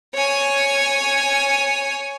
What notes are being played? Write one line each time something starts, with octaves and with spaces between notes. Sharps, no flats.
C#5 G#5